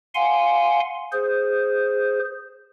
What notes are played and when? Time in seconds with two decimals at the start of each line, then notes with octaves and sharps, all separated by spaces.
0.15 F5 F#5 G#5 C6
1.13 G#4 C5